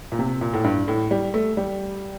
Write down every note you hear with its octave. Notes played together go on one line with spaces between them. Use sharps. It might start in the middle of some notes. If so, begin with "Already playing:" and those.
A#2
C3
A#2
A2
G2
A2
G3
A3
G3